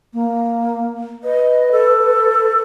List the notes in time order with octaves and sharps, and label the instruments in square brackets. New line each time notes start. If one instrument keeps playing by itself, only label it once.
[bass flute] A#3
[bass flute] B4 [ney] D#5
[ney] A4